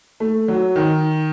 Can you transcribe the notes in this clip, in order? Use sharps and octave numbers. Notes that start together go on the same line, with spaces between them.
A3
F#3
D#3